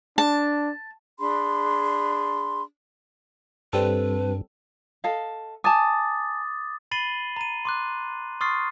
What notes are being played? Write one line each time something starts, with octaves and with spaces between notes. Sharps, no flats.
D4 A5
D4 G#4 B5 C6
G2 G3 C4 A4 B4
A4 D#5 F5
G#5 A5 D6 D#6 A6
B5 A6 C7 D#7 F#7 G7
A#5 D#7
C6 D6 F#6
C6 C#6 D#6 F6 A6 C7